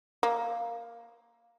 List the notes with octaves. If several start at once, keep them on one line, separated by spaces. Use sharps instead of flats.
A#3